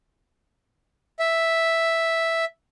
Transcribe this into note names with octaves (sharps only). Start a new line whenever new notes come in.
E5